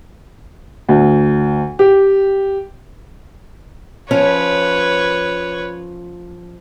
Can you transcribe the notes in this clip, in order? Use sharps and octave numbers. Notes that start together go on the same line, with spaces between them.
D2
G4
F3 C#4 B4 C#5